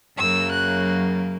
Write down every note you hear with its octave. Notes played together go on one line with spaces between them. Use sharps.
F#2 C#3 F#3 A#3 E6
F#6